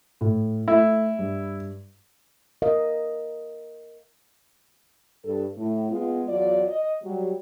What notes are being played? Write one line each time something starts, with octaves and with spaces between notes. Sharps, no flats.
A2
A3 E4
G2
A#4 D#5 F5
G2 A4
A2
G#3 B3 F4
E2 F#3 F4 D5
D#5
F#3 G3